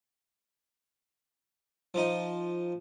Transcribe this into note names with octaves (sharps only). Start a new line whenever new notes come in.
F3 D#4